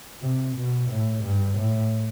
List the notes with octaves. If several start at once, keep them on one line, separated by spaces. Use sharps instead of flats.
C3
B2
A2
G2
A2